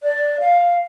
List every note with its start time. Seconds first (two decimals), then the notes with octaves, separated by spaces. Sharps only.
0.02 D5
0.40 F5